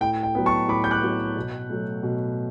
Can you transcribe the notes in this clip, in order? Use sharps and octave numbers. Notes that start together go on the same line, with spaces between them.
A2 G5
G5
F#3 B3
A5 C#6
A2 B5 D6
G6
D6 F#6
F#3 B3
B2
F#3 A3
B2